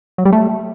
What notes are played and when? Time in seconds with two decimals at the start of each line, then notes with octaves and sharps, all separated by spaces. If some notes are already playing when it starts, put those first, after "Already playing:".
0.18 F#3
0.25 G3
0.32 A3